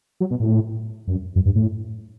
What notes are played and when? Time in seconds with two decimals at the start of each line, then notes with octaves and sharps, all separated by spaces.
0.20 F#3
0.31 B2
0.40 A2
1.08 F#2
1.36 F#2
1.46 G2
1.56 A2